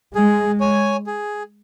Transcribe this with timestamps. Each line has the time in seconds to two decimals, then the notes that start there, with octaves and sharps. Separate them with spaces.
0.14 G#3 G#4
0.60 C#5 G#5
1.07 G#4